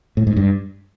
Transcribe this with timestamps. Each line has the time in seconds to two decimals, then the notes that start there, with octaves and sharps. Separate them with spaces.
0.17 A2
0.27 G#2
0.37 G2